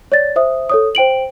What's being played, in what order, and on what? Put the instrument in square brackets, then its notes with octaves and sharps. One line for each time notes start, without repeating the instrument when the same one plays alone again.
[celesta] C#5 D5 A6
C5 E5 D#6
A4 C#5 D#6
C5 G5 D7 F#7